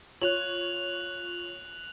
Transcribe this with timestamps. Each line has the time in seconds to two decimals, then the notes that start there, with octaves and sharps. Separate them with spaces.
0.22 F4 C#5 F#6 F7 F#7